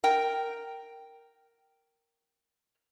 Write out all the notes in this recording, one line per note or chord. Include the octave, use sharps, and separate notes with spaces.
A#4 G5